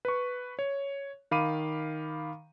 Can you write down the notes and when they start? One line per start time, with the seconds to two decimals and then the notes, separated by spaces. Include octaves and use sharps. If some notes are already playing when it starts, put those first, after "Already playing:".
0.05 B4 C#6
0.59 C#5
1.31 D#3 F5 B5 D6 D#7